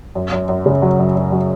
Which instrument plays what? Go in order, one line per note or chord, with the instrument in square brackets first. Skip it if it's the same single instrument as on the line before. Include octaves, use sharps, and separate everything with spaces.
[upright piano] F#2
F#2
F#2
C#3
F#3
F#2
F#2
F#3